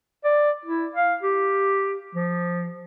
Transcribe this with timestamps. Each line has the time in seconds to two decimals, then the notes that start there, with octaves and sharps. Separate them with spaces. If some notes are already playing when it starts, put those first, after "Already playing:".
0.24 D5
0.65 E4
0.95 F5
1.22 G4
2.15 F3